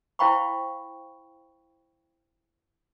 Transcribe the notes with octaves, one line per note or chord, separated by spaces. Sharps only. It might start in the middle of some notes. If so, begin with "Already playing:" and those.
E4 C5 F5 G5 B5 C#6